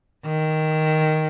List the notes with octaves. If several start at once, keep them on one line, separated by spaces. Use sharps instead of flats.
D#3